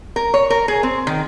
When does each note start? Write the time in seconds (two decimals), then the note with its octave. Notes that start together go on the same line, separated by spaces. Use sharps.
0.16 A#4
0.34 C#5
0.50 A#4
0.68 G#4
0.83 C4
1.07 D#3